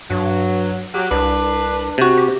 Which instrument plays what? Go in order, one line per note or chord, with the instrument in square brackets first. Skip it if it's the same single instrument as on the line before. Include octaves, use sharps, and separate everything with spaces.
[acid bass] G2 [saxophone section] F#3
[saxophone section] F#3 G4
[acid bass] C2 [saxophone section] D4 B4
[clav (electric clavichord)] C3 F#4
[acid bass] G4